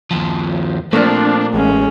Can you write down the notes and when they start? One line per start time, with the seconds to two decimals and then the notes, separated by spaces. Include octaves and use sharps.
0.11 D#2 F3
0.93 A#2 F3 A3 A#3 C4 D4
1.53 A1 G#3 C#4